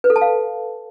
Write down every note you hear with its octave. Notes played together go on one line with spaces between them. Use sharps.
B4
A4
A5
F5